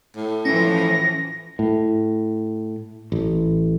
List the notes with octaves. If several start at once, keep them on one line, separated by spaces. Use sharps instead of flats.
A2
E3 F3 C#4 A#6
A2
A1